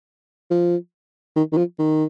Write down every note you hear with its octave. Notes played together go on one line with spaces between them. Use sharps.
F3
D#3
D#3
F3
D#3